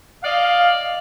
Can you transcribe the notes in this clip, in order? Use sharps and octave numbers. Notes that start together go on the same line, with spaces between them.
D5 D#5 F5